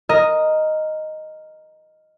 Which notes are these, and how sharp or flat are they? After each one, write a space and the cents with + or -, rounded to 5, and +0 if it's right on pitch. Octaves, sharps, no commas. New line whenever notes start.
A#4 +0 D#5 +0